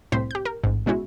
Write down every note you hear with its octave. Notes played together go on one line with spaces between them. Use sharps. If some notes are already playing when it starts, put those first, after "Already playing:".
C2 A2 C4 C5 C6 B6
G4 G6
A#4
A1 G#2
B2 G#3 C#4 E4 F#4